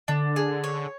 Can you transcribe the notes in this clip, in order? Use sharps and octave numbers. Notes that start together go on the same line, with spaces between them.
D3 D4
G#4
C#5